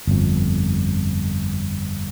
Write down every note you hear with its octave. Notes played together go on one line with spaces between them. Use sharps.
G1 F2